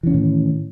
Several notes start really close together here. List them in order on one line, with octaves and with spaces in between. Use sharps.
E3 C#4 D#3 A2